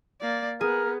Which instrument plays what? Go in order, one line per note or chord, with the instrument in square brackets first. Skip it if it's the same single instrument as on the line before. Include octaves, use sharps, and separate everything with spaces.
[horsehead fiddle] A#3 D5
[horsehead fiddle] B3 [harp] G#4 [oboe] A#4